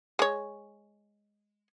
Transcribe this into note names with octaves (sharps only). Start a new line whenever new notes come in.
G#3 C#5